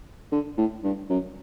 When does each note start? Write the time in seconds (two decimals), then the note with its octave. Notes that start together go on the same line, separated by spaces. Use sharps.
0.32 D3
0.57 A2
0.84 G2
1.10 F#2